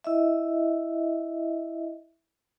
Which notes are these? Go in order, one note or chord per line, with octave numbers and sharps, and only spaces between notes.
E4 D#5 E5